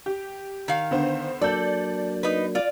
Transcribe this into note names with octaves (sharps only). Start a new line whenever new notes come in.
G4
D#3 F5
D3 B3 C5
F#3 A#3 D4 A4 D5 G6
D#4 B4
F4 D5